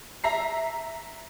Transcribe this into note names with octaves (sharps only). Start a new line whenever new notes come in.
E5 A#5 C7